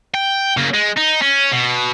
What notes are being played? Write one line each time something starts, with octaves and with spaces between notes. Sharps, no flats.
G5
C#3 A#3
G#3
D#4
C#4
B2